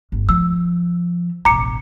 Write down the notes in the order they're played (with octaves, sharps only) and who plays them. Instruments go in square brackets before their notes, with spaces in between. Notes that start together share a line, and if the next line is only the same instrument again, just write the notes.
[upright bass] G1
[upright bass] F3 [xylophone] E6
[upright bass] E1 A1 [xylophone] A#5 D6 C#7